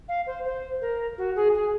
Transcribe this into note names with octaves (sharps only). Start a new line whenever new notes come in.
F5
C5
C5
A#4
F#4
G#4
G#4